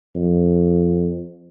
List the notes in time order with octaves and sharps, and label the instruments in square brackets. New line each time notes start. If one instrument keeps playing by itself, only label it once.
[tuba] F2